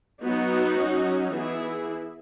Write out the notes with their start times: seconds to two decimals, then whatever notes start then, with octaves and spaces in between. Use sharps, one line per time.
0.22 F#3 B3 D#4 F#4
0.78 F#3 C#4
1.32 E3 B3 E4 G#4